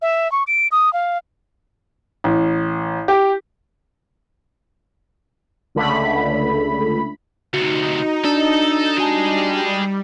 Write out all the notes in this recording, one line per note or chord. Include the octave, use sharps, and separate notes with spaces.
E5
C#6
D7
D#6
F5
A1
G4
C#2 D3 A3 B5
D2 C3 D#4 F#4 C#7
D4 A4
G3 F#4 G#4 D#5 G#5 A5